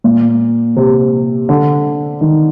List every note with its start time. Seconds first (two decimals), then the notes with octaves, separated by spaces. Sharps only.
0.04 A#2
0.76 C3
1.49 D3
2.21 D#3